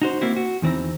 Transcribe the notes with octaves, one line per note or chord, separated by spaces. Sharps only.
D#4 F#4 C5
A#3 C4 E4 F#4
F#4
E2 D#3 C4 E4 A#5